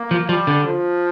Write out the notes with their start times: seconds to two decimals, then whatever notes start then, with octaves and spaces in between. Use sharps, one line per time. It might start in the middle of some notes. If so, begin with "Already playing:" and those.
Already playing: A#3
0.11 F3
0.29 F3 G3
0.47 D3
0.65 F3